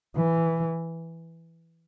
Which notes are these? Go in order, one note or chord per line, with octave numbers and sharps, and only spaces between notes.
E3